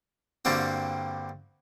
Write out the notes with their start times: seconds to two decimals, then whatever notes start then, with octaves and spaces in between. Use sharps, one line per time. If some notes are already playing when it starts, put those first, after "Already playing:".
0.45 G2 D3 G3 A#3 C4 F#4